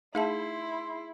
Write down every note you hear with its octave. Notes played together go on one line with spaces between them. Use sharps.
A3 D#4 E4 G#4 E5 A5 C6